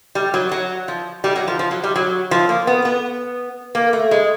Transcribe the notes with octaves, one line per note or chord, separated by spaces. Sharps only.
G3
F#3
F#3
F3
G3
F#3
F3
F3
F#3
G3
F#3
F3
A#3
B3
B3
A#3
A3
G#3